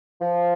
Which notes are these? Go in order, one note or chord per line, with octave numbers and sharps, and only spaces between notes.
F3